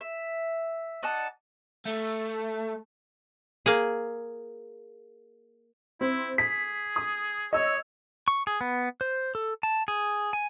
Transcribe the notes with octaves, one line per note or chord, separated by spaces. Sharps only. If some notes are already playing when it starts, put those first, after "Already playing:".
E5
D#4 D5 F#5 A5
A3
A#3 G#4
C4 E4
G#4 B6
D#6
C#5 D#5 E6
C#6
G#4
B3
C5
A4
A5
G#4
G#5